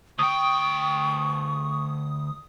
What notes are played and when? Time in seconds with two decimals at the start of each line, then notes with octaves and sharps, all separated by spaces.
0.19 D2 G5 C#6 D#6